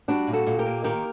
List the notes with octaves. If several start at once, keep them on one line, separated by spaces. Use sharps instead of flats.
G3 D4 F#4
A#2
F#4 A4
A#2
G4 A#4
A#3
D#3 G4 A#4